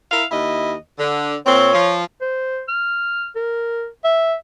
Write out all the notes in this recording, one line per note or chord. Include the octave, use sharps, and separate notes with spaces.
E4 A#4 F5
D#2 E4 D#5
D3
A#2 C4 C#5
F3
C5
F6
A#4
E5